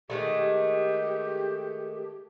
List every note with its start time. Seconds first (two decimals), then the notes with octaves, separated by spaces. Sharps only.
0.10 D#3 G#3 A3 G4